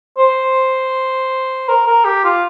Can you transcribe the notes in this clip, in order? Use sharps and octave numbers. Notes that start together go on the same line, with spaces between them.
C5
A#4
A#4
G4
F4